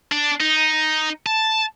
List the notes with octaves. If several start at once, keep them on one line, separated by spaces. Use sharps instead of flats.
D4
D#4
A5